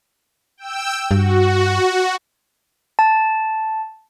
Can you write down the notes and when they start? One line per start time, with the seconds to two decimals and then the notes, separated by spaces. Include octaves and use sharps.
0.57 G5 E6
1.11 G2 F#4
2.99 A5